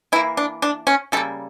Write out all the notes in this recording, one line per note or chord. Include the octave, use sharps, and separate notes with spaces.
E3 A#3 E4
D4
D4
C#4
C#3 G3 A#3 A4